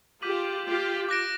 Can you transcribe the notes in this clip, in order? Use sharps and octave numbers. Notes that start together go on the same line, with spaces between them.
F4 G4 D6 G6 B6 D#7 F#7
F4 G4
D6 F#6 A#6 D7